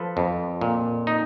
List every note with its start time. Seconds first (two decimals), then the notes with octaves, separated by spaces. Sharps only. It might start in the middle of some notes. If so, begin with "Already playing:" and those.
Already playing: F3 A4 B4
0.17 F2
0.61 A#2
1.07 D#4